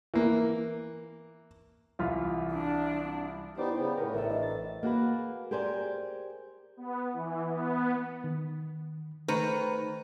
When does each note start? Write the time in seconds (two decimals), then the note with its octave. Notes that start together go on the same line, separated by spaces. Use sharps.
0.14 E3 A#3
1.99 C2 E3 F4
2.53 D4
3.57 B3 D#4 E4 G4 C5 D5
3.76 C#3 B3 G#4 D5 G5
3.97 A2 A#4 B4 C#5
4.14 A1 A4 E5
4.29 D4 E4 D#5
4.43 A6
4.83 A#3 F#4 G#4 B4
5.51 G4 G#4 A#4 C5 D5 G#5
6.77 B3
7.13 E3
7.46 B3
8.24 D#3
9.28 D#3 A3 D#4 B4 C5 A#5